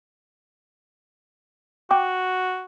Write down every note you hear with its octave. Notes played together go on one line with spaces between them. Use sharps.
F#4 G5 D6